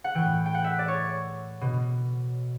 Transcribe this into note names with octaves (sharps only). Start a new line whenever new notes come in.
F#5
A2 E3 G5
G5
F#5
E5
D5
C#5
B2